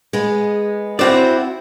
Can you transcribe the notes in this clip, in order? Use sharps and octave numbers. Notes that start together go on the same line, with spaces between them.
G#3 B3
C4 E4 F#4 C5 D5